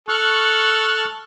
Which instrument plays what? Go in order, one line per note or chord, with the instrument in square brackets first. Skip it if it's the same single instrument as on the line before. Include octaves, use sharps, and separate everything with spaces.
[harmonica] A4 [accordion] C#6 F6 F#6